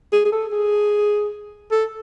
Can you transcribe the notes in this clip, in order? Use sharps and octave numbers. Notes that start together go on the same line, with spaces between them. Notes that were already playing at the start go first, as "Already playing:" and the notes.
G#4
G#4
A4
G#4
A4